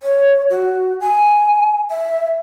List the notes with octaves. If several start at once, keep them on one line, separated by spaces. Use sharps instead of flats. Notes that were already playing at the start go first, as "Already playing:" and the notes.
C#5
F#4
G#5
E5